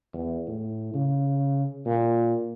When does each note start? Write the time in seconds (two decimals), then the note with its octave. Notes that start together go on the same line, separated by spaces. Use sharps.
0.14 E2
0.48 A2
0.94 C#3
1.85 A#2